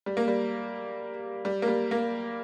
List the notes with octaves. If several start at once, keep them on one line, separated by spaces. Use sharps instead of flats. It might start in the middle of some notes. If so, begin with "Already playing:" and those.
G3
A#3
G3
G3
A#3
G3
A#3